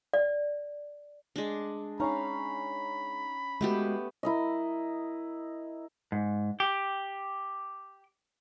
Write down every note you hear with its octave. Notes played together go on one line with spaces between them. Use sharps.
D5
G#3 D4
C#4 D#4 F5 A#5 B5
G#3 A3 B3 F#4 G4
E4 A#4 D#5
G#2
G4